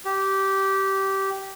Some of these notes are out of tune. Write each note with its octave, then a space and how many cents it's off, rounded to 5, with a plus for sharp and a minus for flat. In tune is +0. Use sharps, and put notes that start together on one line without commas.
G4 -15